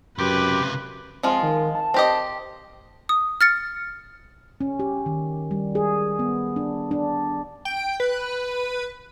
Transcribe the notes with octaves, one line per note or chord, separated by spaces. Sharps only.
C#2 F#2 C3 G4 B4 D6
F3 G#3 C4 F4
D#3
A5
C4 G4 D#5
D#6
F6 A6 C#7
C#4
G4
D#3
G3
G#4
B3
D4
D4
G5
B4